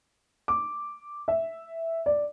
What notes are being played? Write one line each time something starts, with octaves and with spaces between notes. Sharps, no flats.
D6
E5
D5